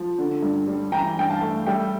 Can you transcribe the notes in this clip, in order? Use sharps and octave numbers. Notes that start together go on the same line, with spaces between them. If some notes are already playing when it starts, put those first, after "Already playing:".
Already playing: F3
D3
G2
G3
E3 G5 A#5
G2 G5
F5 A5
A3
G3 E5 G5